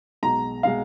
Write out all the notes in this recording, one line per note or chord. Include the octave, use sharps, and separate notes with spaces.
B1 B2 G#3 A#5
B2 G#3 F5